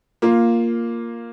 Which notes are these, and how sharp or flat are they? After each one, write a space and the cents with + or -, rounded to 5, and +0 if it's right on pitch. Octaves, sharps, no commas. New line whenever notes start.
A#3 +0 F4 +0